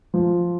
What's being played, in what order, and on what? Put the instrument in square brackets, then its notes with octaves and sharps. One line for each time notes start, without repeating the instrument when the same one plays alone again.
[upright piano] F3